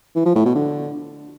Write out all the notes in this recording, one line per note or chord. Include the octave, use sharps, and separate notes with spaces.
E3
F3
A2
B2
D3